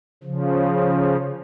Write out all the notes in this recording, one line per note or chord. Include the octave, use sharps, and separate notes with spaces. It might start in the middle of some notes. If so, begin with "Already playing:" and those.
C#3 F3